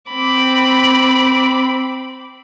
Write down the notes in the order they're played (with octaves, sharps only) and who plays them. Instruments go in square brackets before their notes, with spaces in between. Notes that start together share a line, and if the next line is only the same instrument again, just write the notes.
[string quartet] C4 B5 D6